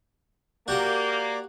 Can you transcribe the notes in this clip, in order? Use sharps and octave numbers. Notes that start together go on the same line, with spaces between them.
A#3 F#4 G4 D5 F#5 G6